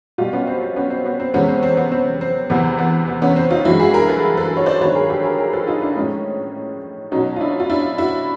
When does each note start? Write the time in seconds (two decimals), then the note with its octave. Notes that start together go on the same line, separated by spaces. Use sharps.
0.18 B2 G3 F4 G4
0.33 B3 C#4
0.47 C4
0.62 C4
0.76 B3 C#4
0.90 C4
1.05 B3
1.20 C4
1.34 E2 C3 F3 G#3 B3 C#4
1.48 C4
1.63 C4
1.77 B3
1.92 C4
2.21 C4
2.50 E2 C3 E3 B3
2.78 B3
3.08 B3
3.22 B3 C#4
3.36 C4
3.51 D#4 F4
3.65 G2 E3 G#3 E4 F#4
3.80 F#4 G#4
3.94 G#4 A#4
4.08 A4 B4
4.37 A4 B4
4.57 C#5
4.66 C5 D5
4.81 G2 D#3 F#3 B4 C#5
4.95 G#4 A#4
5.10 G4 A4
5.24 G#4 A#4
5.38 G#4 A#4
5.53 A4 B4
5.67 D#4 F4
5.81 D4 E4
5.96 A2 F3 G#3 C#4 D#4
7.12 B2 F#3 C#4 D#4
7.36 F4
7.40 D4 E4
7.60 F4
7.70 D4 E4
7.98 E4 F#4